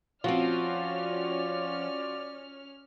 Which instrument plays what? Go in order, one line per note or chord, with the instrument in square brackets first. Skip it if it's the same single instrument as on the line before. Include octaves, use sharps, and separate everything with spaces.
[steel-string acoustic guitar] F3 C4 [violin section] C#4 F6 [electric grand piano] F4 F#4 [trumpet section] D5